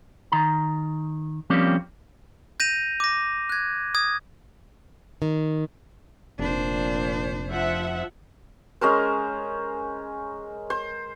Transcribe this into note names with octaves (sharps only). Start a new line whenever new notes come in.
D#3 A#5
F3 G3 A#3 C4 C#4
G6 A#6 D#7 F7
D6 A#6
F#6 G#6
D#6 G#6
D#3
F1 A#2 D4 C5
F3 E5 F#5
G#3 C#4 A#4 C5
C5